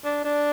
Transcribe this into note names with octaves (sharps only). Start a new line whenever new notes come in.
D4
D4